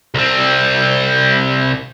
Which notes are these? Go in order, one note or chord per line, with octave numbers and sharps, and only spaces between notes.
C2 C4